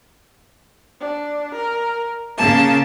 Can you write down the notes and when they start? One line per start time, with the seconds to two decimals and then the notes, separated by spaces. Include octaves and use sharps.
1.01 D4
1.55 A#4
2.37 C#3 A#3 A5